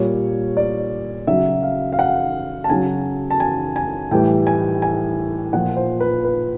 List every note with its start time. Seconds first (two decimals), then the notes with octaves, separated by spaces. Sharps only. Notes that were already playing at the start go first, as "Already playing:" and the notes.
Already playing: A#2 G3 C#5
0.57 D5
1.27 C#3 F#3 E5
1.63 F5
1.92 F5
1.99 F#5
2.64 A5
2.70 C#3 F#3 G#5
3.30 A5
3.40 G#5
3.76 G#5
4.11 A2 E3 G3 G5
4.47 G#5
4.82 G#5
5.53 A#2 F3 F#5
5.77 C5
6.00 B4
6.24 B4